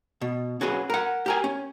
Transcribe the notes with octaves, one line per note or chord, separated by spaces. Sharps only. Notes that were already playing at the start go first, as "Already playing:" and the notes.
B2
C#4 F#4 G#4 B4
A#4 F#5
G4 A#4 G#5
C#4